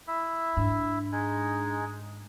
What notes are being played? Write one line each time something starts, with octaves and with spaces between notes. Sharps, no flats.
E4 E5
G#2 D4
G#3 D#4 G#4